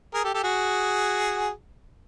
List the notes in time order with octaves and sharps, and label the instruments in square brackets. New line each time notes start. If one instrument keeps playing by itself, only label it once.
[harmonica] G#4 A#4
G4 A4
G4 A4
F#4 G#4